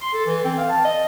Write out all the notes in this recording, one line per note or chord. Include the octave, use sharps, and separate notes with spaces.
C6
A4
E3
C4
F5
A5
D#5